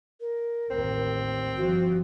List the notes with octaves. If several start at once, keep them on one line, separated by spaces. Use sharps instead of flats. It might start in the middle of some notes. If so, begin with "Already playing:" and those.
A#4
A1 D#2 C4
G1 F3 F#4